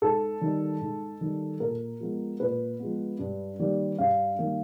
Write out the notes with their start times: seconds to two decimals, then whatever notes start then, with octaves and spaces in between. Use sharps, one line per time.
0.02 G#2 A4
0.41 D#3 G3
0.81 G#2
1.21 D#3 G3
1.60 A#2 A#4
2.00 F3 G#3 B3
2.40 A#2 B4
2.79 F3 G#3 B3
3.19 G2
3.59 D#3 G3 A#3
3.98 G2 F5
4.39 D#3 G3 A#3